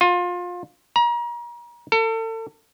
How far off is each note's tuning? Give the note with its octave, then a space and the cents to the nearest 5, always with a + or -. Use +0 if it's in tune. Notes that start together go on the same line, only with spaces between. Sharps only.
F4 +25
A#5 +35
A4 +35